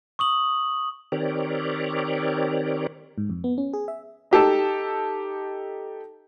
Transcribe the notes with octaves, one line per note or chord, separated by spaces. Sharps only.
C#6 D#6 F#7
D#3 C4 G4 A#4 C#5 D5
G#2
F2
B3
C#4
G#4
E5
D#4 G4 A4 A5